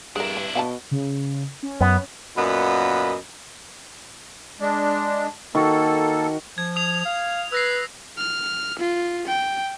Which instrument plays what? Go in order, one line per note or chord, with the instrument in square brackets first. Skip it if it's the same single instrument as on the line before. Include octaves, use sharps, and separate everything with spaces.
[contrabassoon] G2 [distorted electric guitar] D4 E4 [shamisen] G#4 A#4
[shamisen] B4
[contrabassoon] B2 [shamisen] F5 G5 A5
[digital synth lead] C#3
C#4
[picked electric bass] F#2 [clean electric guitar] B3
[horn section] F#2 A#2 B3 D#5 B5
[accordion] G#3 D4
[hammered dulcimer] D#3 F#4 [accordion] A#3 A4
[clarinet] F3 [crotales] G#6
[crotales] D#6 F7
[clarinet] F5
[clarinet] B4 [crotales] E6 A#6 C7
[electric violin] F6
F4
G5